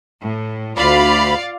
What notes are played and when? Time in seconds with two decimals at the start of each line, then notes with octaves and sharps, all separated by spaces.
0.19 A2
0.78 D2 F4 D5 F5 B5